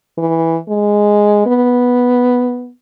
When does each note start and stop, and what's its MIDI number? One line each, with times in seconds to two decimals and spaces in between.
0.18 0.58 52
0.68 1.45 56
1.46 2.71 59